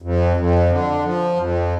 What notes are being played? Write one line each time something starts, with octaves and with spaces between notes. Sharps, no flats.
F2
F2
D3
F3
F2